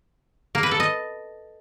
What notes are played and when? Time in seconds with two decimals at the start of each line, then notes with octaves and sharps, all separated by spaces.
0.55 A#3
0.63 B4
0.71 A4
0.80 D#5